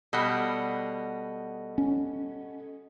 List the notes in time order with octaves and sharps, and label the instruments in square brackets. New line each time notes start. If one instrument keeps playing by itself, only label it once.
[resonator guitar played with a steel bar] B2 G3 [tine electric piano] A4 D#5 F#5
[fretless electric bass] C#4